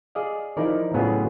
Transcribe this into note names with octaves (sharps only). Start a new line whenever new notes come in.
G#4 D5 D#5 F5
F3 D#4 E4 A#4 D5
A2 C#3 F#3 B3 F4 G#4